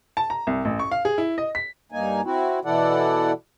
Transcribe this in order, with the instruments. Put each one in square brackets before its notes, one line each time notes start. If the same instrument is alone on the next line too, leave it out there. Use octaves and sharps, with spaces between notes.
[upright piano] A5
A#5
C2
A1
C#6
F5
G#4
E4
D#5
B6
[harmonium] G2 A#3 D#4 G#5
C4 E4 F#4
B2 E3 E4 A4 D5 F#5